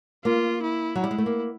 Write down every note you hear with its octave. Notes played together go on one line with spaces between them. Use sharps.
A#3 F4
E4
F#3
G3 E4
G#3
A3
A#3